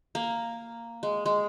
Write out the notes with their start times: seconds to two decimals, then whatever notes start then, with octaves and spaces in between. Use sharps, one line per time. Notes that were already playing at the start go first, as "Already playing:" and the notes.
0.15 A#3
1.03 G#3
1.26 G#3